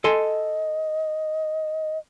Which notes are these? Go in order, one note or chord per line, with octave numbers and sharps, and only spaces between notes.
A4 D#5 G#5 C6